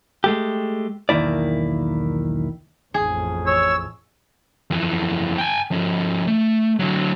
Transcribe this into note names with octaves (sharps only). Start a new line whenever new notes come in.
G#3 A3 G4
B1 E2 D#3 A#3 E4 D5
A1 F2 G#4
C#5 E6
F2 E3
G5 G#5
F3 C#4
A3
D3 F#3